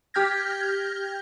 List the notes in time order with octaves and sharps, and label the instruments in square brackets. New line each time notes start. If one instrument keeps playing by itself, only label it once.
[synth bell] G4 G5 F6 G6 G#6 A#6